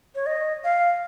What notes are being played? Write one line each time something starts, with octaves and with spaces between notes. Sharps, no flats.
C#5
D#5
F5